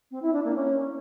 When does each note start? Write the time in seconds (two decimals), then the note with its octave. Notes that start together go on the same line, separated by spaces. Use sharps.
0.11 C4
0.22 E4
0.33 D4
0.44 A#3
0.55 C#4